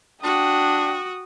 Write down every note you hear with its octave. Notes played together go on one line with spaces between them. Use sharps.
D4 F#4 G5 D#6